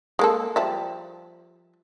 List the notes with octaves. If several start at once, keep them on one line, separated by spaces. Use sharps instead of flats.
G#3 A#3 A4
F3 G3 E5